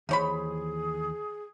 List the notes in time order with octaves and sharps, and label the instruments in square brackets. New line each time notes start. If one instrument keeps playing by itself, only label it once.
[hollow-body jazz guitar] D#2 E3 C5 [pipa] D#4 C#5 B5 [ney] G#4